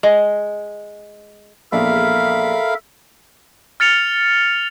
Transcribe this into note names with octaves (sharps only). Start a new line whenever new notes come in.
G#3
A#1 E2 A4 A#4 E5 F5 B5
F6 A6 C#7 F7